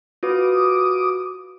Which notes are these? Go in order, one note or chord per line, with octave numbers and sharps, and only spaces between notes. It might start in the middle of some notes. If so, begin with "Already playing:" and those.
F4 F#4 B4 D6 D#6